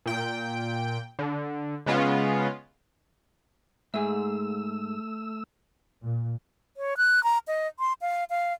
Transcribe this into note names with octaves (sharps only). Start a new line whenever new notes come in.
A#2 G5
D3
C#3 G#3 B3 C#4 F4
G#2 A3 G#4 E6
A#2
C#5
F#6
A#5
D#5
C6
F5
F5